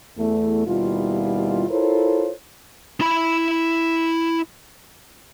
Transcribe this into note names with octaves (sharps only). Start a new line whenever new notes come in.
E2 A3
D#2 B2 G3 E4 F4
E4 F4 A4 A#4 C5 C#5
E4 B5